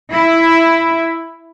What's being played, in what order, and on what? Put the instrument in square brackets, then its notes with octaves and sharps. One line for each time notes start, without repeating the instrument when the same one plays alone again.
[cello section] E4